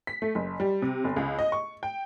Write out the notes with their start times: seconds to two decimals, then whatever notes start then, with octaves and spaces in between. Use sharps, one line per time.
0.07 B6
0.22 A3
0.35 F#1
0.60 G3
0.82 C3
1.04 G1
1.16 C#2
1.39 D#5
1.52 C#6
1.83 G5